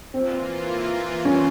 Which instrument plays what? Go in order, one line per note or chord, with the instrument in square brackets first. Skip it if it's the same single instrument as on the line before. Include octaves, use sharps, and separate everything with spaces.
[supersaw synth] E3 A#3 F4 [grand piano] C4
[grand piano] C#4